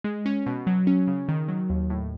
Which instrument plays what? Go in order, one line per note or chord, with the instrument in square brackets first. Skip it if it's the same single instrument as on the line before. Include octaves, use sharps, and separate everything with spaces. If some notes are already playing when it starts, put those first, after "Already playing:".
[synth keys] G#3
C#4
B2
F#3
C#4
C#3
D#3
F#3
D#2
A2